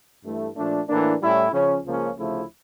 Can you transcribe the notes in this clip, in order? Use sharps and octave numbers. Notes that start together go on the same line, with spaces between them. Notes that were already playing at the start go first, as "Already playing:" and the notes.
G2 E3 A3 E4
A#2 F3 A3 D4
A2 E3 A#3 D4
A2 G3 C#4 E4
C#3 F3 C#4
C#2 C#3 F3 A#3 C#4
D2 C#3 F3 A3 E4